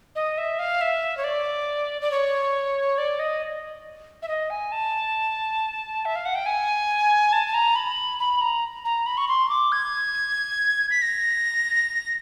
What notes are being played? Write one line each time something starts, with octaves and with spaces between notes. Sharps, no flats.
D#5
E5
F5
E5
C#5
D5
D5
C#5
D5
D#5
E5
D#5
G#5
A5
E5
F5
F#5
G5
G#5
A5
A5
A#5
B5
B5
A#5
A#5
B5
C#6
C6
D6
G#6
B6
A#6